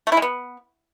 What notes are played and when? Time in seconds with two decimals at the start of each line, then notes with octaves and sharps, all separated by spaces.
0.07 A3
0.12 E4
0.17 G#3
0.22 B3